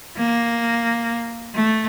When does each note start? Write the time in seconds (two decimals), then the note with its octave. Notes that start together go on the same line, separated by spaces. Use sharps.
0.17 A#3
1.54 A3